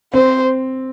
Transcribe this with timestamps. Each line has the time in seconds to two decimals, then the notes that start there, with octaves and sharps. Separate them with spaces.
0.13 C4 C5